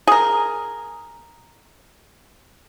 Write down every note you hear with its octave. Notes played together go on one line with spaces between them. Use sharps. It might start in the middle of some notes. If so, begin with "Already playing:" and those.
G#4 A#4